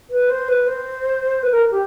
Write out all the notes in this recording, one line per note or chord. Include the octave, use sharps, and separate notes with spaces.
B4
C5
B4
C5
B4
A#4
G4